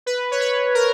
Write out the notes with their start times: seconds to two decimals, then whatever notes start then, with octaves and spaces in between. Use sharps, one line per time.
0.06 B4
0.31 C#5
0.41 B4
0.74 A#4